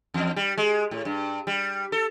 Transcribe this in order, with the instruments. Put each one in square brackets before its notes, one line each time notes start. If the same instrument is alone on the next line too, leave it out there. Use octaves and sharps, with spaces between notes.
[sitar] E2
G3
G#3
A2
G2
G3
A4